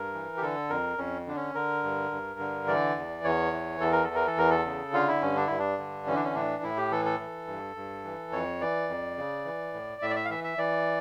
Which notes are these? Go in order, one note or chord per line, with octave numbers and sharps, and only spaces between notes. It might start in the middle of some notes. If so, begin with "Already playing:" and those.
Already playing: G2 A#4
E3
G4
D3 A4
F2 A#4
F2 C#4
D3 D4
C#4
D3 A#4
G2
G2
D3
E3 D5
E2
E2 C#5
E3
E2 A4
A#4
E3 A4
A#4
A4
E2 A#4
A4
C#3
D3 F4
E4
G2 C#4
D4
G2 E4
D4
D3
E3 C#4
D4
C#4
A2 D4
A2 E4
G4
E3 A4
A4
E3
G2
G2
E3
F2 C#5
E3 D5
F2
C#3
E3
A2
A2 E5
D5
E5
F5
E3 E5
E5
E3 D5